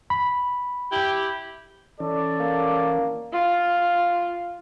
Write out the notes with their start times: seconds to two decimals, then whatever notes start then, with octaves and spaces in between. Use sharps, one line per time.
0.10 B5
0.91 E4 G4
2.00 E3 C#4 A4 D5
2.40 A#3
3.33 F4